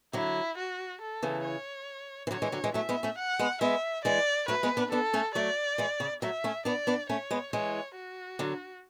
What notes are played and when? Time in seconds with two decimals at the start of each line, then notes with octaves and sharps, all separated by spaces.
0.13 D3 F#3 E4
0.58 F#4
1.01 A4
1.23 C#3 E3
1.44 C#5
2.27 E3
2.31 D3 F#3 C#5
2.42 E3 G#3
2.52 D3 F#3
2.64 E3 G#3
2.74 F#3 A3 E5
2.89 G#3 B3
3.03 A3 C#4
3.18 F#5
3.39 G#3 B3
3.61 G#3 B3 E5
4.05 E3 G#3 D5
4.48 F#3 A3 B4
4.63 G#3 B3
4.77 B3 D4
4.91 B3 D4 A4
5.13 A3 C#4
5.35 F#3 A3 D5
5.78 E3 G#3
6.00 C#3
6.22 F#3 A3 E5
6.44 A3 C#4
6.65 B3 D4 D5
6.87 B3 D4
7.09 A3 C#4 C#5
7.31 G#3 B3
7.53 E3 G#3 C#5
7.96 F#4
8.39 D3 F#3